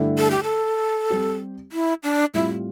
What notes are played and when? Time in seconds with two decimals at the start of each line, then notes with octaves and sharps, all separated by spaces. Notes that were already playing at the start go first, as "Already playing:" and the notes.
Already playing: G2 D3 A3 E4 G4
0.18 A4
0.31 G4
0.44 A4
1.10 G3 C4 G4
1.72 E4
2.03 D4
2.34 A2 G3 C4 E4 F4